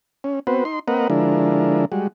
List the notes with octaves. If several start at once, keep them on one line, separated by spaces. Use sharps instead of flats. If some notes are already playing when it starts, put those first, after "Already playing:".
C#4
B3 C4 F#4 B4 C5
D#4 C6
A#3 C4 A#4 B4 D#5 F#5
D3 F3 G#3 D4 E4 A#4
G3 G#3 F#4